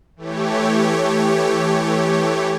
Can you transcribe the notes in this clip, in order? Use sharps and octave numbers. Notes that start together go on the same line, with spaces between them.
E3 A3 G4 C#5